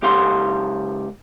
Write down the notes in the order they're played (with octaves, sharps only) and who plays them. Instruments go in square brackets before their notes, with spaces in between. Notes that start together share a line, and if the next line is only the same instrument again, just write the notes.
[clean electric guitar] C#2 G4 F5 C6